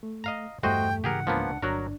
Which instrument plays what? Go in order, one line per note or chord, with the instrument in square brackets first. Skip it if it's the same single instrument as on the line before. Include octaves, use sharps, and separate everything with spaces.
[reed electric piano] A3
[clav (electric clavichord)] D#5 F5 A#5
[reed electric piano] E2 A3 [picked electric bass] G2 G3 [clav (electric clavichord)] F#4 C5 D#5 [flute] G5
[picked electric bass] G#2 C#3 E3 [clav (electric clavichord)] G4 G#4 A#4 [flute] F#5
[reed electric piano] C#2 D4 A5 [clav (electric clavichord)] F3 A#3 B3
[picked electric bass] G1 [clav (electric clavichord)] F#3 F#4 A#4 [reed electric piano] D4